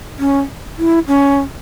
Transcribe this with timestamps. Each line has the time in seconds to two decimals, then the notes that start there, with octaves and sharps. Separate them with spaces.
0.19 C#4
0.78 E4
1.08 C#4